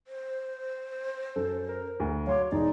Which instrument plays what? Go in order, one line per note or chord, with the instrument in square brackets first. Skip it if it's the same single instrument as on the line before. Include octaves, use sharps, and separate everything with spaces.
[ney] C5
[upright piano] F#2 [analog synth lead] A4
[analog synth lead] A#4
[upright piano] D2
[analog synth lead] F#3 [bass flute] C#5 [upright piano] F5 C6 D6
[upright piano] E1 [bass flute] D#4 [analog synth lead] D5